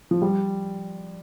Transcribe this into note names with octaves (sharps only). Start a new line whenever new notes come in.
F3
G3